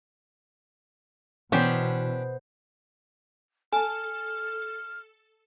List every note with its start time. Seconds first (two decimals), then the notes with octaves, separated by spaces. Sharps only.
1.52 B2 E3 B3 C#4 D4 G4 C5
3.73 A4 G#5 A5 F6